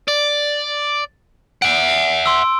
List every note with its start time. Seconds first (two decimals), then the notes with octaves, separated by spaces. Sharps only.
0.08 D5
1.62 E5 F#5 D7
2.26 C6 E6